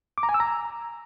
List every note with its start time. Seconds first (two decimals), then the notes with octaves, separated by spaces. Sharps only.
0.18 D6
0.23 A#5
0.29 G#5
0.34 E6
0.40 A#5